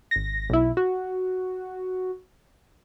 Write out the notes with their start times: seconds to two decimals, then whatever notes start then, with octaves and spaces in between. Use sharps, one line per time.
0.11 G#1 A#6
0.50 B1 E4
0.77 F#4